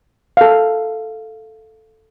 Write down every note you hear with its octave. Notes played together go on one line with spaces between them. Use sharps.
A4 F5